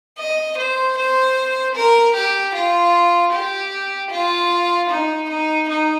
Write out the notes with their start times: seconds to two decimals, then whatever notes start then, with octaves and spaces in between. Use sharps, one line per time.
0.18 D#5
0.58 C5
0.97 C5
1.76 A#4
2.15 G4
2.54 F4
3.32 G4
4.11 F4
4.90 D#4
5.29 D#4
5.69 D#4